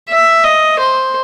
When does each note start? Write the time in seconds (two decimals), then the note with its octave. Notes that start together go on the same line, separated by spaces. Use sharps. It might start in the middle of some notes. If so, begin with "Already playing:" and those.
0.09 E5
0.44 D#5
0.79 C5